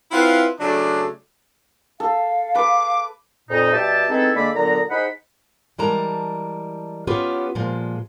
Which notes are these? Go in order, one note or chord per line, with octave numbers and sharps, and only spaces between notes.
C4 E4 F4 B4 F5 F#5
C#3 F#3 A3 D4
A4 F5
B4 D6
F2 A#2 D#4
B2 G3 G4 E5 G5 A5
G#3 B3 C4 D#4 E4 A4
D3 G#3 A#3 A4 D5 B5
A#2 D3 F#3 B3 A#5
D#4 G#4 C5 F#5 B5
E3 G3 G#3 A#4 A5 A#5
B3 C#4 F4 G4 B4
A#2 F3 G#3